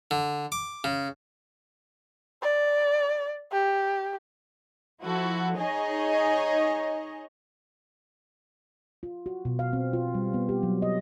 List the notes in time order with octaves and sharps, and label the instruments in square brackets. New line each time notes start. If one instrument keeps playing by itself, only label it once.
[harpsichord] D3
D6
C#3
[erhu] D5
G4
[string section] F3 E4 F#4 A4
D#4 G#4 C#5 D#5
[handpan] F4
F#4
B2
F5
C4
F4
G3
B3
G4
F#3
D#5